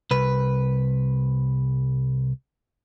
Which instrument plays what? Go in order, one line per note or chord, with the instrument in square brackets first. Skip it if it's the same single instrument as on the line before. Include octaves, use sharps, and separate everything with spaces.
[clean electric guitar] C2 B4